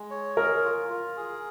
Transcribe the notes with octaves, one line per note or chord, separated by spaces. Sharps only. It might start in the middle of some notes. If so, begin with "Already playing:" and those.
Already playing: G#3
C#5
G#4 A#4
F4
F4
G#4